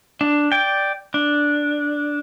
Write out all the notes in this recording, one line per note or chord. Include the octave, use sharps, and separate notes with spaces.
D4
D5 G5
D4